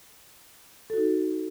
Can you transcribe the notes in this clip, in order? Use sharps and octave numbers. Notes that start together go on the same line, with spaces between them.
D#4 F#4 A4